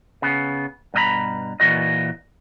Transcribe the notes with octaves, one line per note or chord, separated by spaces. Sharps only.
C#3 B3
G2 B2 D#5 A#5 B5
A#2 E3 F#4 D#5